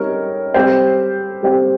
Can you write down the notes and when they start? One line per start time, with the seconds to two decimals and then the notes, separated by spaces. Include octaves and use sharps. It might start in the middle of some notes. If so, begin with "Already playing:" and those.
Already playing: G3 C4 D#4 A#4 C#5
0.54 G3 C4 G4 C5
1.42 G3 C4 G4 C5